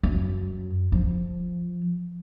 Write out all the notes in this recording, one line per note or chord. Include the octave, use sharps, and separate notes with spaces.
F#2
F3